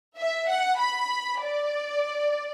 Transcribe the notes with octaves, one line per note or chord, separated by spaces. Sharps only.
E5
F#5
B5
D5